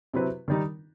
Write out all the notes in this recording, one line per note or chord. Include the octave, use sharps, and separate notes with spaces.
C3 F#3 C4 E4 B4
D#3 G3 D#4